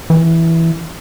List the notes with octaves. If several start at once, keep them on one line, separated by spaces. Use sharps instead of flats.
E3